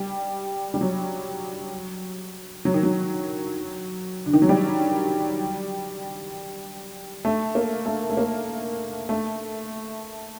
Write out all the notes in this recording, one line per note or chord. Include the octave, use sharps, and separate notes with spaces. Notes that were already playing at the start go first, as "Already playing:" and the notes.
Already playing: G3
G3
F#3
F#3
D#3
F#3
D3
D#3
F#3
G3
A3
A#3
A3
A3
A#3
A3